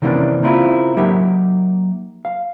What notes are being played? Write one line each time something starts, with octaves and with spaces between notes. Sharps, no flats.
C3 D#3 E3 A#3 C#4 D4
C#3 A#3 C4 E4 F4
F#3 A#3 D#4 G4 A#4 E5
F5